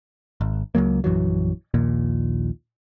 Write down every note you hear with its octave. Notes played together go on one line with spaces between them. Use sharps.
G#1
C#2 C#3 F#3 A#3
A#1 F#2 E3 F#3
A#1 D#2 A#2